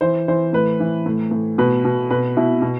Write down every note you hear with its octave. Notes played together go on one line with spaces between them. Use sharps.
E3 C5
E3 C5
A2 B4
E3
A2
A2
B2 B4
B2
B2 B4
B2 E4
B2